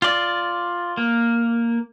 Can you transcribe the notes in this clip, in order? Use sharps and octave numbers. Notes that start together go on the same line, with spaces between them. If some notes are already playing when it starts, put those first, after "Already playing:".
F4 D5
A#3